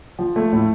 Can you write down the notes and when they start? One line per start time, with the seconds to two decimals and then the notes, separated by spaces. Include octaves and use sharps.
0.19 F3
0.36 A3
0.53 A2